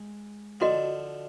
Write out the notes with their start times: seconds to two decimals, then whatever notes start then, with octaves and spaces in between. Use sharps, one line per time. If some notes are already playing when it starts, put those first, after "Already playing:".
Already playing: G#3
0.60 D3 F3 F#4 A#4 D#5